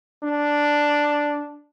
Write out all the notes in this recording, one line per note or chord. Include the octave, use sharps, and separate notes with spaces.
D4